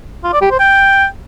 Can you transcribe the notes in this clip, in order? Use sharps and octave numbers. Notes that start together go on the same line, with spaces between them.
F4
D5
G4
C5
G5